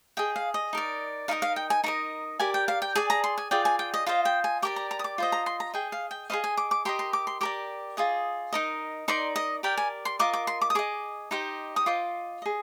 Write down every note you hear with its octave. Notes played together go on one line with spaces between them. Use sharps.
G#4 D#5 G5
F5
D#5
D#4 A#4 D5
D#4 G4 A#4 D#5 F5
F5
G5
G#5
D#4 A#4 D#5 A#5
G4 A#4 D5 G#5
G5
F5
G5
G#4 D5 G#5
A#5
C6
G#5
F4 G#4 D5 G5
G#5
G5
D#5
F4 C5 D#5 F5
G5
G#5
G4 A#4 D5 D6
A#5
A#5
D#6
D6
F4 C5 D#5
A#5
C6
A#5
G#4 D#5 G5
F5
G5
G#4 C5 D#5 F5
G#5
D6
D6
G4 A#4 D#5 C6
C6
D6
C6
G4 A#4 D5 D6
F4 G#4 D#5
D#4 A#4 D#5
D#4 A#4 D5 C6
D#5
G4 A#4 D5 G5
G#5
C6
F4 A#4 D#5 D6
D6
C6
D6
D#6
G#4 D#5 D6
D#4 G4 C5 D#5
D#6
F4 C5 D#5 D6
G#4 D#5